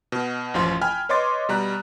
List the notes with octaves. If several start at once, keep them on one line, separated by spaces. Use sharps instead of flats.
B2
A1 F#2 F3 F4 C6
G5 G#5 B5 F6
B4 C#5 D#5 C6 D6 A6
B2 G3 A#5 F#6